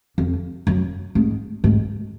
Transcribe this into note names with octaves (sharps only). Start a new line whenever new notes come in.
F2
F#2
G#2
G#2